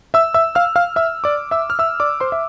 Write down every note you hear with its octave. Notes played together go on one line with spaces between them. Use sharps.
E5 E6
E5 E6
F5 F6
F5 F6
E5 E6
D5 D6
E5 E6
F6
E5 E6
D5 D6
C5 C6
E5